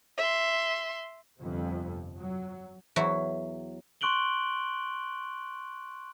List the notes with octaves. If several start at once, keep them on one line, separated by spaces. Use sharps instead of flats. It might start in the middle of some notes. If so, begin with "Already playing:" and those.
E5 C6
G1 F2 C3
F#3
E2 F#3 E4
C6 C#6 F#6 D7 F#7 G7